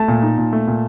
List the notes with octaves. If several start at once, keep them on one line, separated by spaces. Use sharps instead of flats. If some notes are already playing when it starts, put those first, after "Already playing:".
Already playing: A3 A5
A#2
D#4
A#2
A3
A#2